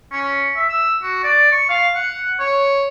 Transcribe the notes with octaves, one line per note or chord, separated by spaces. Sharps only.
C#4
E5
E6
F#4
D5
C#6
F5
F#5
C#5